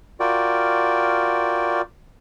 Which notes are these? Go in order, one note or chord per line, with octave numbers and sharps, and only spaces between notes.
F4 F#4 A#4 D5 G5